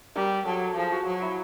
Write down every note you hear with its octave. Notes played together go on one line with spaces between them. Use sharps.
G3 A#4
F#3 A4
F3 G#4
F#4
F#3
E4